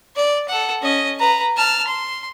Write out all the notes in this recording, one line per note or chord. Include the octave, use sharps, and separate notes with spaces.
D5
A4 F#5
C#4 D#5
B4 A#5
A5 F6
C6